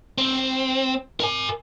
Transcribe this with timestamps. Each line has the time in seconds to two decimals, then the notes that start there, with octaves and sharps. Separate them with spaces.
0.18 C4
1.20 A#4 G#5